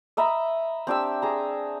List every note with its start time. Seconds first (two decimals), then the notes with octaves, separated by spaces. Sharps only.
0.17 D#5 E5 A#5 B5
0.87 C4 D4 G4 E6
1.22 G#4 A#5